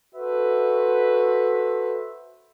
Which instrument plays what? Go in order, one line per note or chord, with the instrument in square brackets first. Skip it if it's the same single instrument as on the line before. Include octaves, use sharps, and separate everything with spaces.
[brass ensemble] F#4 A4 B4 C5 E5